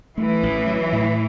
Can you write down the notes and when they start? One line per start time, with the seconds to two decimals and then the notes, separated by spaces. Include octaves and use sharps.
0.18 E3 A3
0.43 A1
0.67 F#3
0.92 A2